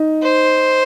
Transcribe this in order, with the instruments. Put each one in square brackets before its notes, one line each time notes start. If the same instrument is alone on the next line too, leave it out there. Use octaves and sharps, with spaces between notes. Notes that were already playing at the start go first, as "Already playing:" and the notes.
Already playing: [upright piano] D#4
[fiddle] C5